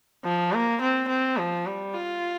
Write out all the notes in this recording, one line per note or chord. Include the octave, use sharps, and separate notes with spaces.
F3
A#3
C4
C4
F3
G3
F4